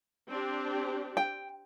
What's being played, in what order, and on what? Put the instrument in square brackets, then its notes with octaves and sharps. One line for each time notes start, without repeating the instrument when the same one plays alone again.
[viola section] C4 D4 G4
[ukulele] G5